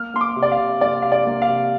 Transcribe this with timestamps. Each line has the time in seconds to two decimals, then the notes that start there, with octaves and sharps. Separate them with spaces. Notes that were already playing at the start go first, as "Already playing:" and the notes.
Already playing: A#3 F6
0.14 A#3 C6
0.21 D6
0.36 C3
0.43 D5
0.52 F5
0.59 C3
0.81 A#3 D5
1.02 C3 F5
1.12 D5
1.26 A#3
1.42 F5
1.49 C3